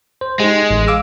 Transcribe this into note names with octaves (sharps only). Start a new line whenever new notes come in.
C5
G#3 D#4 G4
A1
F5 D6 E6